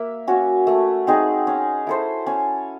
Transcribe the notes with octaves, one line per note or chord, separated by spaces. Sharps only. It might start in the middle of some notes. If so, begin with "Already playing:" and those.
Already playing: A#3 E5
C#4 F#4
A3
C4 D#4 G#4
C#4
E4 A4 C5
C#4